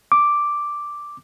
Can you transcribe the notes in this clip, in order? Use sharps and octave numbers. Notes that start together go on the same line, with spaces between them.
D6